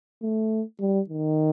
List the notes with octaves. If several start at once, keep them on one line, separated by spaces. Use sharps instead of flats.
A3
G3
D#3